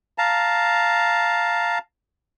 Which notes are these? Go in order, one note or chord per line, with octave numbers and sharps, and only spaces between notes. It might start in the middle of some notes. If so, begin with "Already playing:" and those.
F5 A5 A#5